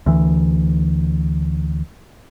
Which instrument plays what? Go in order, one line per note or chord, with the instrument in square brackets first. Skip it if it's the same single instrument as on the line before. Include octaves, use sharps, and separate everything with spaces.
[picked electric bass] D2 E3